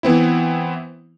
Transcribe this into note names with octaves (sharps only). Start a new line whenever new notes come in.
E3 B3 C4 E4